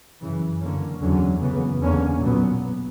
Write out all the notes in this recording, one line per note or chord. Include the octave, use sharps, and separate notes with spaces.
F#2 C#3 E3
F#2 D3 A#3 C#4
E2 D3 F#3 C#4
F#2 C#3 E3 B3
E2 D3 A#3 C#4
B1 A#2 F#3 B3